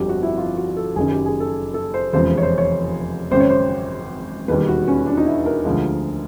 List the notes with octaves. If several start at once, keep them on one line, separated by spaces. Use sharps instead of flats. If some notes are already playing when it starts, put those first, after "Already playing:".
Already playing: G1 F2 D3 F#3 G4
F#4
E4
F4
F#4
A4
F#1 F#2 D#3 G#4
G4
G#4
A4
A4
C5
F1 E2 C#3 F3 G#3 C5
C#5
C5
C#5
G#1 F#2 C#3 C5
C#5
C5
E1 D#2 D#3 G3 B4
F#4
C#4
D4
D#4
E4
A#4
D2 D3 F3 G#3